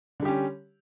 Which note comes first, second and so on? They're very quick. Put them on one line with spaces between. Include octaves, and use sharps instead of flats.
D3 G3 G4 C#4